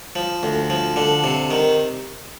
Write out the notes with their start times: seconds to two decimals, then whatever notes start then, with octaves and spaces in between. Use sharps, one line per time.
0.16 F3
0.43 D2
0.70 F3
0.96 D3
1.24 C3
1.51 D#3